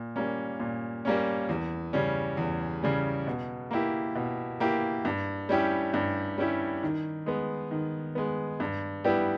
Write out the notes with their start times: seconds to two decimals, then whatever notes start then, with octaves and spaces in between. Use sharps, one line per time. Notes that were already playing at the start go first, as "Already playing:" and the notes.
Already playing: A#2
0.16 G3 A#3 C#4
0.60 A#2
1.05 G3 A#3 C#4
1.49 E2
1.93 C#3 G3 C#4
2.37 E2
2.83 C#3 G3 C#4
3.27 B2
3.71 A#3 E4 G4
4.15 B2
4.60 A#3 E4 G4
5.05 G2
5.49 G3 C#4 E4 G4
5.94 G2
6.38 G3 C#4 E4 G4
6.83 D#3
7.26 G#3 B3
7.71 D#3
8.15 G#3 B3
8.60 G2
9.04 G3 B3 E4 G4